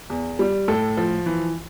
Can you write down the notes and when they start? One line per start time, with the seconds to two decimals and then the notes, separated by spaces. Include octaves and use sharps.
0.10 E2
0.39 G3
0.68 A2 A4
0.97 F3
1.26 E3